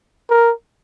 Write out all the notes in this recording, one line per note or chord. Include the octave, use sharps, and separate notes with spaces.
A#4